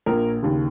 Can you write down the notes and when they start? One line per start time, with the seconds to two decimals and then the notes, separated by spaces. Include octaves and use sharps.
0.06 A#1 A#2 A#4
0.42 D#2 C#3